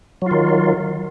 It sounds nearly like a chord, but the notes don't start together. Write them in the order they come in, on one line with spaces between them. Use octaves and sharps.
F#3 F4 D#3